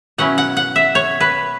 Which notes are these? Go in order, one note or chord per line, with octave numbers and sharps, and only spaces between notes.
B2 F#3 C#4 E4 F#5
F#5
F#5
E5
C#5
B4